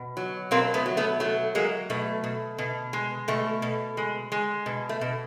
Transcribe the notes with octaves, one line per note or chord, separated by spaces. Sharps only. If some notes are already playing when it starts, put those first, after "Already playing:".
Already playing: B2
F#3
B2 A#3 C4
A3 B3
F#3
A3 B3
F#3 A3
F#3 G#3 A#3
B2 A3
B2
B2
G#3
B2 A3
B2
G#3
G#3
B2
A3
B2